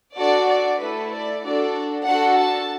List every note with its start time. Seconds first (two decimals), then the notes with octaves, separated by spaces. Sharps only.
0.16 D4 F#4 A4 D5
0.48 D5
0.79 A3 E4 A4 B4
1.11 D5
1.42 D4 F#4 A4 D5
2.05 D4 F#4 A4 F#5
2.38 A5